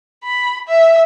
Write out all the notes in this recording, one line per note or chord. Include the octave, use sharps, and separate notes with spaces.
B5
E5